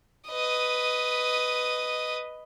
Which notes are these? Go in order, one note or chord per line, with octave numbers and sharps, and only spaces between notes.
B4 D#5